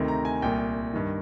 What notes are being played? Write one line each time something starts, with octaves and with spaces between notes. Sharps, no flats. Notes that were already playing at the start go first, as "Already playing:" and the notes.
Already playing: D2 C3 D#3
A#5
G#5
C2 A#2 G5
G2 D#3